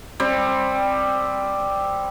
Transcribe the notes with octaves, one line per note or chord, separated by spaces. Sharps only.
G3 C4